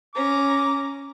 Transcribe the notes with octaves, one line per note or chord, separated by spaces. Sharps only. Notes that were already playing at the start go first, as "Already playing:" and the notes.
C#4 A#5 D6